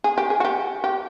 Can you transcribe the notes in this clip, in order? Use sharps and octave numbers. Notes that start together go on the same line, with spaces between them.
G#4
G4
G#4
F#4
G4
G4